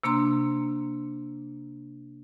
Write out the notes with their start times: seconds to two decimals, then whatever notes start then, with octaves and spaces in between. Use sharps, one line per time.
0.04 C3 A#3 D4 A#5 C6